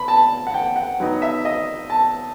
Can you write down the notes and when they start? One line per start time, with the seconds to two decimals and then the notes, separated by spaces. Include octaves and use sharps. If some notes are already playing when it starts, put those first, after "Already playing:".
Already playing: B5
0.08 A5
0.47 F#5
0.54 G5
0.76 F#5
1.00 F#3 B3 D#4
1.22 E5
1.45 D#5
1.90 A5